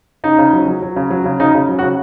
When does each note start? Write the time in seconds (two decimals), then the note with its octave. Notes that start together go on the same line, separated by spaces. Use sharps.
0.24 C#3 D#4
0.38 C#3
0.53 F#3
0.68 F#3
0.82 F#3
0.96 C#3
1.10 F#3
1.26 C#3
1.40 C#3 D#4
1.55 C#3
1.69 F#3
1.79 F#4
1.82 C#3